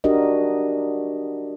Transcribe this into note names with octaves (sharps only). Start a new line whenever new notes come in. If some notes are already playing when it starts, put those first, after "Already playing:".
D4 F#4 G4 A#4 D#5